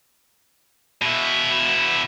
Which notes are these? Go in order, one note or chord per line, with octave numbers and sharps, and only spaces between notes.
B2 E4